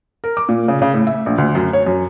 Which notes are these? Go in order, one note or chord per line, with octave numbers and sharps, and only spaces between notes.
A#4
D6
A#2
C#3
C#3
A2
E5
A#1
D2
F#2
C#5
F#2